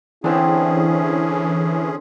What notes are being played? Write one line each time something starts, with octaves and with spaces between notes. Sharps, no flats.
D3 E3 C4 C#4 E4 G#4